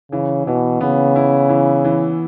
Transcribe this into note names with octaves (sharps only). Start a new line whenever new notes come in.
C#3 E3
B2 E3
C#3 B3
E4
E3
E3